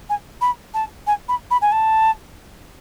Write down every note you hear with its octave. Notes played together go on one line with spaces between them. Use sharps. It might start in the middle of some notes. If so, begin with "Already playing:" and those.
G#5
B5
A5
G#5
B5
B5
G#5
A5